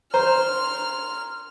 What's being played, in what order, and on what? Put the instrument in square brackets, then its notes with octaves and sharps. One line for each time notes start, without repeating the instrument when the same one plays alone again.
[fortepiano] C5 [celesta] A#5 [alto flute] C6 [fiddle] F6